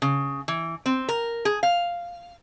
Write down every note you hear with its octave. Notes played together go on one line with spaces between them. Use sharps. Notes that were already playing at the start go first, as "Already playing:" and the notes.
C#3
E3
C4
A#4
G#4
F5